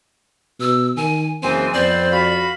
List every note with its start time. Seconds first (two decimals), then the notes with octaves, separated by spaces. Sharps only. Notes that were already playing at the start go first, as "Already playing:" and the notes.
0.61 B2 E6
0.97 D#3 G#5
1.43 F#1 C#3 E3 C4 G#5
1.73 F2 B3 C4 C5 D5
2.12 F#4 F5 B5